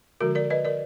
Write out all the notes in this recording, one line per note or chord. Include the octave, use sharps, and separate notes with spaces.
D3 F3 G#3 F#4 A#4
A#4 D5
B4 D#5
A#4 D5